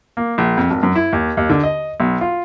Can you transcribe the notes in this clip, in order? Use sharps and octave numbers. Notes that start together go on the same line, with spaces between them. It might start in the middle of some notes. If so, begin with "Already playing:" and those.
A#3
A#1
F2
G#1
F#2
E4
D#2
D#2
D3
D#5
B1
F4